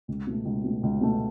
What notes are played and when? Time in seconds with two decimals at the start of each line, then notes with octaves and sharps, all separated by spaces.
0.08 C#2
0.27 B2 A3
0.45 C#2
0.64 B2 A3
0.83 C#2
1.01 B2 A3